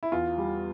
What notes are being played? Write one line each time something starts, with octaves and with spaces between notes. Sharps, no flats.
E4
E2 F4
G3